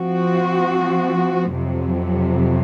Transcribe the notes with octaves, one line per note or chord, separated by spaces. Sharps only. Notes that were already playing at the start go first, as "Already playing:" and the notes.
Already playing: F3 C4 F#4
F2 C3 F#3